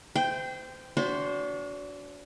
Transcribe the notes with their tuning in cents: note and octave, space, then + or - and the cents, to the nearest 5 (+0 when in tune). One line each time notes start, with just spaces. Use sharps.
C5 -30 G5 +0
D4 -35 F#4 +0 C5 +0